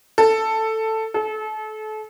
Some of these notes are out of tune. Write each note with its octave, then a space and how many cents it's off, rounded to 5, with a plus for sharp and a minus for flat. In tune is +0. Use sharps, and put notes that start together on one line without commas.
A4 +5
A4 -35